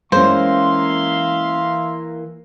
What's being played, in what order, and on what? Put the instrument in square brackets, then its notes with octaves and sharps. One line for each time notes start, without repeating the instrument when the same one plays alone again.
[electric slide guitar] E3 A#3 [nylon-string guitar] G#3 C#4 [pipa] C5 [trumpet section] E5 F5 C6